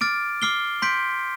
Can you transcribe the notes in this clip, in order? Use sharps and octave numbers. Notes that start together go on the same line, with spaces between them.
D6 F6 A6 D7
D6 F6 C7 G7
C6 G6 B6 D7